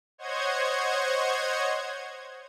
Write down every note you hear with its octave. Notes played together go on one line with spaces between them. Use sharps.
C5 C#5 D#5 F#5 G#6